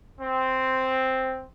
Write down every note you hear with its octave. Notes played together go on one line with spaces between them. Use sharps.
C4